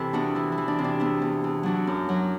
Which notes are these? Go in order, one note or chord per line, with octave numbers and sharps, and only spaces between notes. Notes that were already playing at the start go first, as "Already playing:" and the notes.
Already playing: C3 E3 E4 A4
E2 D4 F#4
E3 E4
E4
E3
D4
C3
D4
E2 E4
E2
E2
F#3 D4 F#4
F#2
F#3